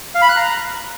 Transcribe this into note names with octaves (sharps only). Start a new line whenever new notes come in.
F5
B5
F#6
A#5